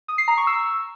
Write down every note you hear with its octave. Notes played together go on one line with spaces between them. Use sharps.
D#6
C7
A#5
C#6
E6